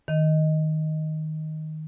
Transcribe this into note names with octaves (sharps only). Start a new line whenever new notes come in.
D#3 D#5